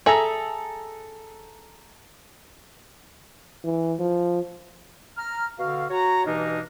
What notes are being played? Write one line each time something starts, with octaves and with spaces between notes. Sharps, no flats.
G#4 A4 E5 A#5
E3
F3
A#5 F6
B2 D3 F#4 F5
F#4 C#5 A#5
G2 B2 E3 A#3 D4 D#4